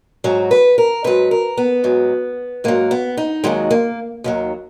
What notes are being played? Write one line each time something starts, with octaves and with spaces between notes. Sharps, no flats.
G#2 F#3 F#4
B4
A#4
G#2 F#3 B4
A#4
B3
G#2 F#3
G#2 F#3 A#3
B3
D#4
D#2 D#3 F#3 G#3
A#3
D#2 D#3 F#3